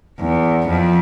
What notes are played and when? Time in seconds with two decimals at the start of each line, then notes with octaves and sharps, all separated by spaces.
0.20 E2
0.67 F2